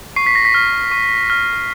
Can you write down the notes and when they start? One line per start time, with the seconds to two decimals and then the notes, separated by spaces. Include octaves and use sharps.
0.16 C#6 C7
0.27 B6
0.35 A#6
0.45 B6
0.54 F6
0.92 C#6
1.30 F6